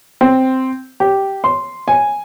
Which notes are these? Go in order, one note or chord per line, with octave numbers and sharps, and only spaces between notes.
C4
G4
C6
G#5